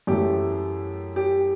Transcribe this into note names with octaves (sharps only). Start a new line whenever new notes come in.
F#2 E3 A3 G4
G4